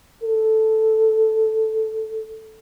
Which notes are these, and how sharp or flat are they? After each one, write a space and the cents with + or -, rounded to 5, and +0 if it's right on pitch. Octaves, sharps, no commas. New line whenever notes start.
A4 +0